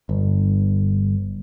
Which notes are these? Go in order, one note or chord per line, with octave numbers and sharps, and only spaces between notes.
G1